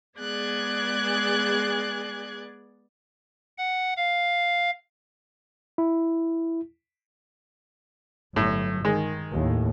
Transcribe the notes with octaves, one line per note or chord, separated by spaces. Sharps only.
G#3 B3 G#4 D5 F#6 G#6
F#5
F5
E4
G1 A2 F#3
D#3 G#3
D#2 A2